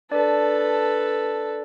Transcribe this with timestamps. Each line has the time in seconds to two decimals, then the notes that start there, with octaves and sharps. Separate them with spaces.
0.11 D4 A4 B4 D5 A5